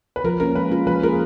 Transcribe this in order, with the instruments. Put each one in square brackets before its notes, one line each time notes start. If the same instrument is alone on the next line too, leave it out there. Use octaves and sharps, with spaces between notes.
[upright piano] B4
[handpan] F3 [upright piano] A#4
[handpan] A#3 C#4 [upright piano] A#4
[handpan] G#3 [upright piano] B4
[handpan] C#4 F4 A#4
[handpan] F3 [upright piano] B4
[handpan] A#3 F4 G#4 [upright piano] A#4